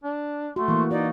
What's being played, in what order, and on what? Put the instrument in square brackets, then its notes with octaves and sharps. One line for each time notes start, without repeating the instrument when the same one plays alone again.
[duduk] D4
[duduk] A3 [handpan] F#4 [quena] C6
[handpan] E3 A#3
[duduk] D#4 [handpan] F#4 [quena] D5